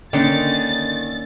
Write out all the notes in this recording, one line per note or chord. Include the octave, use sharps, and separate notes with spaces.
D3 D#3 A#3 C#4 D#4 A6